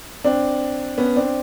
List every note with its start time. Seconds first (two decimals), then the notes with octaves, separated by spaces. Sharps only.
0.24 C4 D4
0.98 B3 C#4
1.16 C4 D4